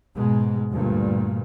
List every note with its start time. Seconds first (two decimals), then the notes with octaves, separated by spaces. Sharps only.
0.15 G#2 B2 G#3
0.71 D2 G2 A#2